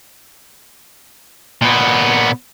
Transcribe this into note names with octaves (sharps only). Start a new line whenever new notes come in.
A#2 B3